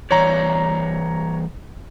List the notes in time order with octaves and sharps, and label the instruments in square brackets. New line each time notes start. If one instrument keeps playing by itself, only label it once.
[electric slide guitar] G2 E3 D5 [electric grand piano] C#5 A#5